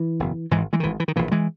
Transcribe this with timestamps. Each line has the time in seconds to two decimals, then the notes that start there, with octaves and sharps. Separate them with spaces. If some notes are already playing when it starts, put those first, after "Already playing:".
Already playing: E3
0.20 F#1 E2 B2
0.51 G#1 G#2 E3 G#3
0.73 E3 G#3
0.80 D#3
0.83 G#1 G#2 E3
1.00 E3
1.08 D#3
1.16 A#1 A#2 E3
1.32 E3 G#3